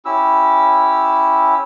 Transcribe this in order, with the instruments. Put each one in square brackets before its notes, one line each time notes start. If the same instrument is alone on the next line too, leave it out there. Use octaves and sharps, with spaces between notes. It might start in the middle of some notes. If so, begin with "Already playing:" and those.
[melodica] C#4 E4 G4 E6